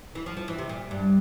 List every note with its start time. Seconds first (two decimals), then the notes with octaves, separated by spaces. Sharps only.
0.15 E3
0.26 F3
0.37 F3
0.48 E3
0.58 C3
0.69 A#2
0.91 G2